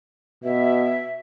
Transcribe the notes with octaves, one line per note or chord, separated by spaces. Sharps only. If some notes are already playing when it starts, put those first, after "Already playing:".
B2 E5